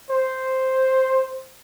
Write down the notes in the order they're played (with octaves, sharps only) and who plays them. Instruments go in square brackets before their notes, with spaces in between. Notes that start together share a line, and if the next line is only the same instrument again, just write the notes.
[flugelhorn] C5